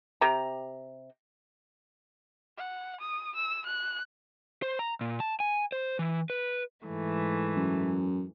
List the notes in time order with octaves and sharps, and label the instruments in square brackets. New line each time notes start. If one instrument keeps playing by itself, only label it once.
[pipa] C3 G4 G5 A#5
[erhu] F#5
D#6
E6
F#6
[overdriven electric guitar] C5
A#5
A#2
A5
G#5
C5
E3
B4
[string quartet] G#2 E3 A3
[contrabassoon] F#2